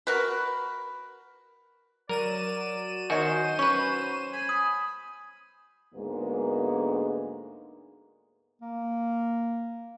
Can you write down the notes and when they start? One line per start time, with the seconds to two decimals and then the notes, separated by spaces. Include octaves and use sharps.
0.07 F#4 A#4 B4
2.09 F#3 A#4 D5 D#7 E7
3.10 D#3 F#4 C5 C#5 D#5 G#5
3.59 C#4 B4 C#6
4.33 G#5 B5
4.49 D#6
5.94 D2 G#2 D3 G#3 A#3 B3
8.62 A#3